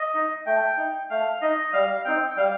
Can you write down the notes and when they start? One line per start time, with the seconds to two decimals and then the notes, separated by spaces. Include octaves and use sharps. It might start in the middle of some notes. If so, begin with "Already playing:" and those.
Already playing: D#5
0.14 D#4
0.46 A3 G5
0.77 D#4
1.10 A3 F5
1.42 D#4 D#5
1.73 G3 F5
2.05 C4 D#4 G5
2.30 G5
2.36 G3 F5